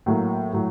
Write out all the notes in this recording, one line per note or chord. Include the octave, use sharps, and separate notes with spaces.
A2 F#3 A#3
A2 F#3